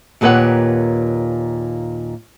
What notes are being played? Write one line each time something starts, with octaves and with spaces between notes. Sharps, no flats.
D#2 A#2 G4 B4 C#5 F#5